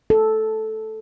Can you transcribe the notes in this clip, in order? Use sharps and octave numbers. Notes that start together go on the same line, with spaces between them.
A4